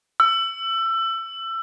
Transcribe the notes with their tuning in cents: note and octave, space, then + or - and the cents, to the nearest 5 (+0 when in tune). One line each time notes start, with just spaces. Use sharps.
E6 +25